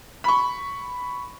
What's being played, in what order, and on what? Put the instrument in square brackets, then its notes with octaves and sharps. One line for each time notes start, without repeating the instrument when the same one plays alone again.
[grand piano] B5 C#6